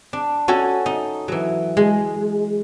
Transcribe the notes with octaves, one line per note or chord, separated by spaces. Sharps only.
D4
C#4 F#4 A4 G#5
D#4
E3 F#3
G#3